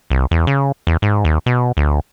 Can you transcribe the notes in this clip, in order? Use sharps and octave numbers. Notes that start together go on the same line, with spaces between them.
C2
E2
C#3
E2
G#2
D#2
B2
D2